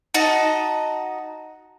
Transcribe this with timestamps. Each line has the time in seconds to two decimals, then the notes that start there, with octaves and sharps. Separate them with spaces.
0.14 D#4 F#4 D#5 A5